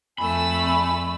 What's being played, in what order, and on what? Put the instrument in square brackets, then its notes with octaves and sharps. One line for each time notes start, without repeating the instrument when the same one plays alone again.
[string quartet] F2 A3 E6 [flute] G#5 [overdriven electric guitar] B5